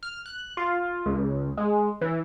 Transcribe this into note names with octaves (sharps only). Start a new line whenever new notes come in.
F6
F#6
F4
C#2
G#3
E3